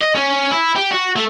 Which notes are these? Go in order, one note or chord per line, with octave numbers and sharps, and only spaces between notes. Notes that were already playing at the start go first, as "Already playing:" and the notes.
D#5
C#4
E4
G4
F#4
A3